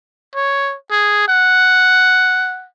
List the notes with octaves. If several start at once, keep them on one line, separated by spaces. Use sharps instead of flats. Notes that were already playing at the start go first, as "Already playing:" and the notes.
C#5
G#4
F#5